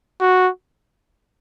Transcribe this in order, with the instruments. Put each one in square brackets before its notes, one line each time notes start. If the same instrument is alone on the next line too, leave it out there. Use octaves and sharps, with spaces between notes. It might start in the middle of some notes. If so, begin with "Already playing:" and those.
[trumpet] F#4